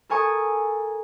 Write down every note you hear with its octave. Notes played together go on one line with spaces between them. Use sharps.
A4 A#4 G#5 C#6 D#6